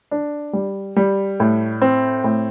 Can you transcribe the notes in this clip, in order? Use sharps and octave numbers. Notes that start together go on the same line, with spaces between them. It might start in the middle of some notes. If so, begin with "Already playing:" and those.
D4
G3
G3
A2
C4
A2